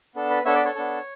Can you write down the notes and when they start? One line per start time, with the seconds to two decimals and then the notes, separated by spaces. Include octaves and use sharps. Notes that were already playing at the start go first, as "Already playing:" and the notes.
0.15 B3 D4 A4
0.30 B4
0.45 B3 D4 A4 C#5 E5
0.55 B4 D5
0.65 A4 C#5
0.75 B3 D4 A4